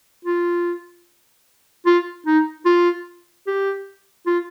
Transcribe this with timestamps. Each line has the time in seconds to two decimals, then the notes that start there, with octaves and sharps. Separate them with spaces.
0.25 F4
1.86 F4
2.26 D#4
2.65 F4
3.47 G4
4.26 F4